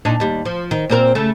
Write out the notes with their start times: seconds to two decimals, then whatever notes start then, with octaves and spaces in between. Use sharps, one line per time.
0.05 A#2 D4 D#4
0.20 D#2 G3
0.45 F3
0.71 D#3
0.90 A#2 C4 A#4
1.15 C#3 A3